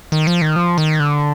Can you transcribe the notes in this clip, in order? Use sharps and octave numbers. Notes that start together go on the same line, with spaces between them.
D#3
F3
D#3
F3
D#3
D3